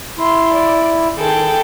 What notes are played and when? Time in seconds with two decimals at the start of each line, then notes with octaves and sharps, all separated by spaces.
0.18 E4 C6
0.54 D5
1.17 D#3 G#4 A4 G5